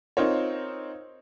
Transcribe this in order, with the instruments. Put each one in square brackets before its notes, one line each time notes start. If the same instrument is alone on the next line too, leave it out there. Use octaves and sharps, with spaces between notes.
[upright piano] C4 D#4 F4 A#4 C5 C#5